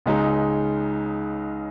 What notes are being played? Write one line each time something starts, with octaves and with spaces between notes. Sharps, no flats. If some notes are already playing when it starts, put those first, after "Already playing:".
C#2 C#3 G#3 D#4